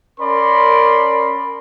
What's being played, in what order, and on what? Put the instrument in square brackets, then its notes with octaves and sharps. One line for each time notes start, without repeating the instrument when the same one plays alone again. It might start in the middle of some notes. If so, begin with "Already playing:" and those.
[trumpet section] C#4 A#4 D5 B5 C6